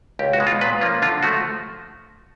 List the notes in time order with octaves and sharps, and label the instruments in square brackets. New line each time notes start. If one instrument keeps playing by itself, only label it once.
[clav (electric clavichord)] C#2 G4
F#4
B2 G#3
F4
A#2 B4
F3 A#3 C#4 F4
D3 F4
F3 A3 F#4